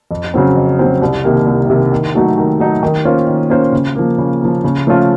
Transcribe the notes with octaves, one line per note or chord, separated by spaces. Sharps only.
F2
C#3 F#3 C4
F2
C#3 F#3 C4
C2
C3 D#3 A#3
C2
C3 D#3 A#3
D#3
F#3 A3 D#4 F#4
D#3
F#3 A3 D#4 F#4
D#3
A#3 C#4 F4 C5
D#3
A#3 C#4 F4 C5
C#3
F3 A#3
C#3
F3 A#3
C#3
F3 A3 C#4 F4